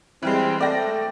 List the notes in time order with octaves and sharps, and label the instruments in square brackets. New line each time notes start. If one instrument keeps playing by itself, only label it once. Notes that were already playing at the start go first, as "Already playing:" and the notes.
[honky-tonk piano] E3 G3 G#3 [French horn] C4
[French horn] A3 [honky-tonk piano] D5 G5 A#6